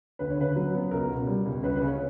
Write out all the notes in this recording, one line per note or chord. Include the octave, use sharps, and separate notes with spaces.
D2 B4
C#5
C#3 B4
F#3
B3
C#2 A#4
B2
G3
C#2
C#2 B4
B4
C#3
C#5